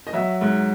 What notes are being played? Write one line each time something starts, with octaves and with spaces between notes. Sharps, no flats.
D#5
F#3 E5
G#2